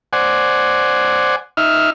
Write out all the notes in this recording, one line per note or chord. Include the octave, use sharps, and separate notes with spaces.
C5 D5 F#5 G#5
D#4 E5 F6